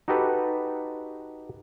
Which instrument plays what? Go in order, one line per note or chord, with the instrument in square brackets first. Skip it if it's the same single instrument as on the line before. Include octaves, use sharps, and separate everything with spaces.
[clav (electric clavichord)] D#4 F#4 G4 A4 B4